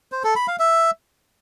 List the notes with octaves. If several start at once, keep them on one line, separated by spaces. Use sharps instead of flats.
C5
A4
B5
F5
E5